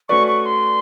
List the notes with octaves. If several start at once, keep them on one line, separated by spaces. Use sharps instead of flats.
A3 C#4 F#4 B4 D5 C#6
C#6
C6